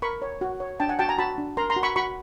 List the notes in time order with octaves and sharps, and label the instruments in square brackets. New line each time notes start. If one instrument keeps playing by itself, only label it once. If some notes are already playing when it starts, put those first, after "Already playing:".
[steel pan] A#4 B5 C#6
C#5
F#4
C#5
D4 G5 A5
F#5 G#5
F#4 G5 A5
G#5 A#5
F#4 A5 B5
D4
A#4 A#5 C6
A#5 C6
F#4
B5 C#6
F#4 B5 C#6